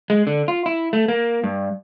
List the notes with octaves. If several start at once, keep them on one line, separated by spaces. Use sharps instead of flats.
G#3
D3
F4
E4
A3
A#3
G2